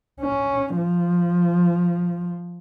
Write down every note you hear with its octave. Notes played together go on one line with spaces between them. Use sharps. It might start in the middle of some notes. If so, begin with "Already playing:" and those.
C#4
F3